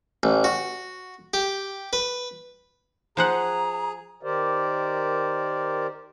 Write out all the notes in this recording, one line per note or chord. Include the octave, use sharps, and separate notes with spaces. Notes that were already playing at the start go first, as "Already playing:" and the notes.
A1
F#4
G4
B4
F3 G#4 C5 F#5 A#5
D#3 G4 A#4 C5 D5